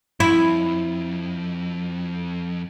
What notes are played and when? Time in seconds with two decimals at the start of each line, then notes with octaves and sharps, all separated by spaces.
0.20 F2 E4